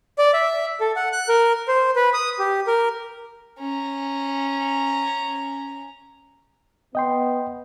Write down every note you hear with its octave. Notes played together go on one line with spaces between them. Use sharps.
D5
E5
A4
F#5
F#6
A#4
C5
B4
D#6
G4
A#4
C#4 A#5
B3 D#5 G5 C6